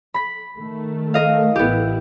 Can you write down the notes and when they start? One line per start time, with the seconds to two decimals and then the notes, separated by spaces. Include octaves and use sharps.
0.14 B5 B6
0.59 D#3 A3
1.14 A#4 D#5 F5
1.56 A1 B3 E4 G4